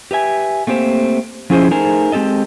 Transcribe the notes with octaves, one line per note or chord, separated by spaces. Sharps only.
G4 B4 E5 G#5
A3 A#3 C4 G4 C5
F3 C#4 E4 G#4 C5
A3 D#4 G#4 A#4 C5 G#5
G#3 C4 G4 A4 D#5